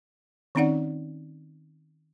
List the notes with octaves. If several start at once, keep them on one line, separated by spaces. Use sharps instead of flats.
D#3 C4 C#4 D#4 D5 F#5